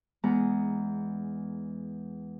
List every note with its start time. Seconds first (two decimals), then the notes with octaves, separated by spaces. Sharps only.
0.23 E2 G#3 B3 F#5 A#5